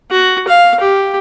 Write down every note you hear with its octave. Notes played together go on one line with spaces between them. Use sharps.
F#4
F5
G4